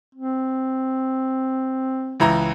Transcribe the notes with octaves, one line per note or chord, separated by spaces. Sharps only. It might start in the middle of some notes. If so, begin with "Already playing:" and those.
C4
C#2 E3 A#5